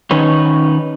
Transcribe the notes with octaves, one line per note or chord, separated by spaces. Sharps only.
D#3 C#4 D#4 B4 C#5